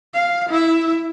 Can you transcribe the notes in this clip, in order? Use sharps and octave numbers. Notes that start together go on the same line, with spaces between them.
F5
E4 E5